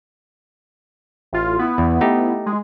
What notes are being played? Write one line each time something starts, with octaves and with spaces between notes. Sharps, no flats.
A1 F4
B3 E4
E2
A3 D#4 G4
G#3